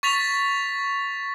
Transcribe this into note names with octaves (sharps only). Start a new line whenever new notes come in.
C#6 A6 B6 F7